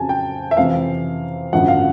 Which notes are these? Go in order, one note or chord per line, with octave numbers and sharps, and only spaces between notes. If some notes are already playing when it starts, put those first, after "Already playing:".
Already playing: F2 C#3 F#3 G#5 A5
G5
E5
F2 C3 E3 F5
G#1 F#2 D3 F3 F#5
F5